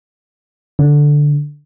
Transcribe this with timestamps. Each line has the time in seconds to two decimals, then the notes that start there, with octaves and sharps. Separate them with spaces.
0.79 D3